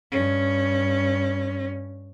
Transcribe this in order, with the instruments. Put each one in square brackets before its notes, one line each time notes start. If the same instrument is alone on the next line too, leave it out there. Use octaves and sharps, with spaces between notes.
[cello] G2 C#4